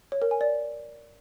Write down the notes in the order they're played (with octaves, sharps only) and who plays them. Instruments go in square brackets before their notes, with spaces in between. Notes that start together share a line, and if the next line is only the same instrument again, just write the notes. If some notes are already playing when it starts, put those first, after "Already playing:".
[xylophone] C#5
A#4
G#5
D5